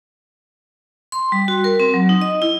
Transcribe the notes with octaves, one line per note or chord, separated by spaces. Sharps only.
C6
G3
F#4
A#4
C4
F#3
D#4
D#5
E4